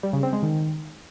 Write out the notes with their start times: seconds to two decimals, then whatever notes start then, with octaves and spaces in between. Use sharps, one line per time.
0.03 G3
0.13 C#3
0.23 C4
0.33 G#3
0.43 D#3